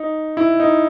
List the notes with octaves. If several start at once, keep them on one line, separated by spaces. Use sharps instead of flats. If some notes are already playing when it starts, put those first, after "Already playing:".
Already playing: D#4
E4
D#4